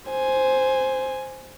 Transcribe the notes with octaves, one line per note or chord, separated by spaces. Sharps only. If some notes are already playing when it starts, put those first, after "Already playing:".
C5 G#5